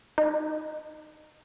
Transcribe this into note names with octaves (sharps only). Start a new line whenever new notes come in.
D#4